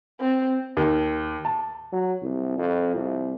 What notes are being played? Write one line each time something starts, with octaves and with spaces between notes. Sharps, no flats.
C4
D#2
A5
F#3
C2
F2
C2